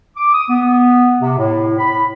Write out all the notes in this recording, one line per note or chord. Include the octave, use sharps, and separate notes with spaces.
D6
D#6
B3
C3
A2
B5